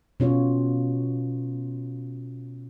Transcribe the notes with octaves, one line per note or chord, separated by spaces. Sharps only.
B2 C#4 F4 C#5